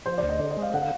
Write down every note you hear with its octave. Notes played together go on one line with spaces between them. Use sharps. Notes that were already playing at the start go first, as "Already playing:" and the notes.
F3 C5
D2 D5
D#5
D3 D5
D#5
G#3
F5
D3 F#5
F5